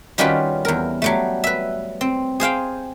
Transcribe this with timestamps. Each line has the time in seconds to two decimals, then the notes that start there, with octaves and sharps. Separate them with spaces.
0.18 D#3 G3 C#4 F4 F#4 B4
0.65 E2 A#4
1.02 F#3 G3 A3
1.44 B4 E5
2.01 C4
2.40 G#4 C5 F5 G5